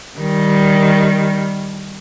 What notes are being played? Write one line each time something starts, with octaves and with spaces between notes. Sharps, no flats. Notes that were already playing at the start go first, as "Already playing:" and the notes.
D#3 G3